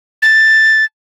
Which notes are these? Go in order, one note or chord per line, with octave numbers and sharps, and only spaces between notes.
A6